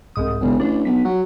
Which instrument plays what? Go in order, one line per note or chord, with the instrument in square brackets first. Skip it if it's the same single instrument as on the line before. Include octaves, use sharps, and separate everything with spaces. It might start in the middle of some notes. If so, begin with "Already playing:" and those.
[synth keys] C2 G#2 D#6
[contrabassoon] E1 [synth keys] A#1 C#3
[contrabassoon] A1 [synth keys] D4
[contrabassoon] B1 [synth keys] B6
[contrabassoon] F#3